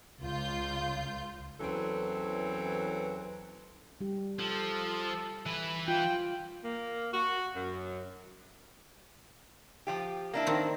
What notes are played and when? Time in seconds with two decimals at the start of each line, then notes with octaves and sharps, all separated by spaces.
0.22 C#2 F4 G6
1.60 E2 E3 F#3 C4 C#4 A4
4.01 G3 G4
4.39 F3 A4
5.46 E3 B4
5.88 F4 G5
6.65 A#3
7.14 F#4
7.55 F#2
9.87 F3 F4 G4
10.34 A#3 D4 E4
10.47 D#3 C4